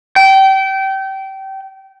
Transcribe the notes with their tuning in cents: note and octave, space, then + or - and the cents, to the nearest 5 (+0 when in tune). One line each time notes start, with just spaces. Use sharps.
G5 -25